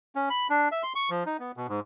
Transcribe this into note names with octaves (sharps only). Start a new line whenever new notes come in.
C#4
B5
D4
E5
C6
C#6
F3
D#4
B3
B2
G#2